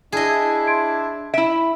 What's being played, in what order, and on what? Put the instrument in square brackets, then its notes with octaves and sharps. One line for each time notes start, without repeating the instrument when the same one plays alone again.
[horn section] D4 E4 [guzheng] G#4 D#5
[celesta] C6 G#6 D7
[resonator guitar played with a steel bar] E4 E5 [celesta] D7